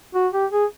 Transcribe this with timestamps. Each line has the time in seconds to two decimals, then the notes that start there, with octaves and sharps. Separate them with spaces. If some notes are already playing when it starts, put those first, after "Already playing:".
0.15 F#4
0.33 G4
0.52 G#4